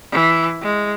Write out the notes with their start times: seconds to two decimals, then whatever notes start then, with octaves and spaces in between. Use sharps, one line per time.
0.13 E3
0.62 G#3